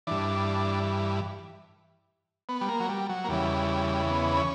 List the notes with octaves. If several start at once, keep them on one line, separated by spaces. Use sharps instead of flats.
G2 E3 D4
B3
G3
A#3
F#3
G3
F#3
A#3
E2 C#3 E3 G3
B3
C#4